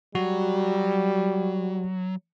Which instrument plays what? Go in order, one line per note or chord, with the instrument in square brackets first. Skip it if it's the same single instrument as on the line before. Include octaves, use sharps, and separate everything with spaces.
[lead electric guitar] F#3 [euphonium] G3 [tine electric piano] F#4